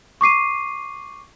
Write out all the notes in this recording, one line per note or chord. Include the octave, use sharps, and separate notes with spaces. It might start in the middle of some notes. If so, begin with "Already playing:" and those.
C#6 D6 C7 D#7